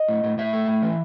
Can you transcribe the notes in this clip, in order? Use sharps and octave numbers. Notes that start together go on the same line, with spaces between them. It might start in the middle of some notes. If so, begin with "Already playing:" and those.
Already playing: D#5
A2
A2
A2 E5
A3
A2
E3